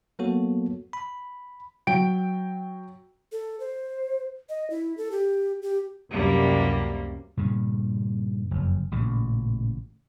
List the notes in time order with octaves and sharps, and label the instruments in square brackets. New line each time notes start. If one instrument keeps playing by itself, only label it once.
[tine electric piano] F#3 A#3 B3 F#4 A4 C#5
B5
[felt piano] F#3 G5 D7
[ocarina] A4
C5
D#5
E4
A4
G4
G4
[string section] C#2 F#2 C3 G3 A#3
[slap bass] G2 A#2 C#3
F#1 F2
A1 A#2 C#3